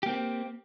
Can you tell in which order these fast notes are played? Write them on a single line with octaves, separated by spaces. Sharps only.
G4 A#3 C4